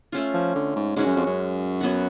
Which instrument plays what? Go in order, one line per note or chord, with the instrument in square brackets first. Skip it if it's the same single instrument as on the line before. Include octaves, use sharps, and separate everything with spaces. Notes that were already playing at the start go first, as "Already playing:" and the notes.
[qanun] A3 C#4 F4
[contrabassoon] F3
D3
G#2
[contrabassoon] G#2 [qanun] G#3 C#4 F#4
[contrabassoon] F#2
F2
F#2
[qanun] F#3 B3 F#4